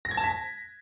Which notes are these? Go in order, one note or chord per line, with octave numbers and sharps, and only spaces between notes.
A#6
G#6
A5
B6